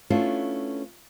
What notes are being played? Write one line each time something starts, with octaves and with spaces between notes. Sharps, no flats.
A3 B3 C#4 D4 E4 F4